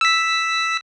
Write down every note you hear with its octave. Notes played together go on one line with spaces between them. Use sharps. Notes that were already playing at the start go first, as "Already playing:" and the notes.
E6 B6